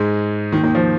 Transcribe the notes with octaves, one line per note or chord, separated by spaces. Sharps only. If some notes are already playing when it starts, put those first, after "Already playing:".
Already playing: G#2 G#3
D#2 D#3
D#2 D#3
F3